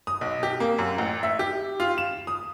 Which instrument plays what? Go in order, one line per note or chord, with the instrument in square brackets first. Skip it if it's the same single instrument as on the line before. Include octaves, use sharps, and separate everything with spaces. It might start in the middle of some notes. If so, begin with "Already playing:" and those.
[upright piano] D#6
B1
G4
A#3
F#2
A1
E5
G4
F4
E7
D#6